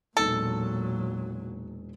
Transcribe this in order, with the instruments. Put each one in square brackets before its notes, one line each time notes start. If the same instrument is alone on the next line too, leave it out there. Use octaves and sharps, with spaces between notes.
[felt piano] E1 D#4 [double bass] A#2 F#3 [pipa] A4